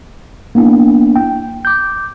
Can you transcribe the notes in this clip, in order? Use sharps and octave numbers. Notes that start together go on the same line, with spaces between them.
A#3 B3 D4 E4
G5
D6 G6